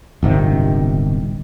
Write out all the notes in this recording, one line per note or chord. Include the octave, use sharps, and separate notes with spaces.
D1 G1 C3 D#3